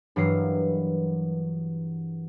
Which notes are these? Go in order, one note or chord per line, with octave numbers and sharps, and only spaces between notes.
G2 E3 F#3 A#4 C7